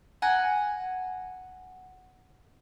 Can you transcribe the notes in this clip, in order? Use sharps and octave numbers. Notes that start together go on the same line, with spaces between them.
F#5 G#5 A#5